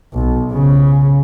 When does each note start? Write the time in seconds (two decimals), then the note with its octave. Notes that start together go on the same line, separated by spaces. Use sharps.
0.13 B1
0.52 C#3